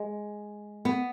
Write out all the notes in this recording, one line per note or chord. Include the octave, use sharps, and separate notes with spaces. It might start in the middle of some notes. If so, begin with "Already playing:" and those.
Already playing: G#3
B3